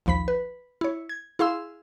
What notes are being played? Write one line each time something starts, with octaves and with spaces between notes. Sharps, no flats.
A#1 D#2 F3 B5 B6
B4
E4 C#5
G#6
E4 G#4 F5 C6 E6